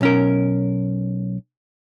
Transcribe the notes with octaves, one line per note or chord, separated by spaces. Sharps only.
B1 C#4 A#4